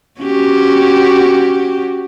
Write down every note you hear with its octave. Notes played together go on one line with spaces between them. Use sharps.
C#4 F#4 G4